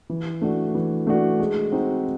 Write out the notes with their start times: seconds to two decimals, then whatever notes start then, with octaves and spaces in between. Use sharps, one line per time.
0.10 E3
0.41 A3 D4 F#4
0.75 E3
1.07 A3 D4 F#4
1.40 G#3
1.72 C4 D#4 F#4